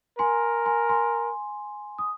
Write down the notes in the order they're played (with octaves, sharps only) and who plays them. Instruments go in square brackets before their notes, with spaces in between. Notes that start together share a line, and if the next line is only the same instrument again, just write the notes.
[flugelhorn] A#4 [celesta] G#5 C6
[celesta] G#5 C6
G#5 C6
D#6